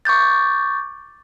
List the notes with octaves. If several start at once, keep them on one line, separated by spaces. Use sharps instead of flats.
C#6 D6 G6 A6